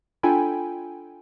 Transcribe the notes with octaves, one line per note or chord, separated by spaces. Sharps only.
D4 F4 A4 G5 G#5 B5